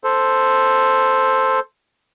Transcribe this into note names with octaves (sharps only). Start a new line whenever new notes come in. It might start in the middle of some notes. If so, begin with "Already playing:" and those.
A4 C5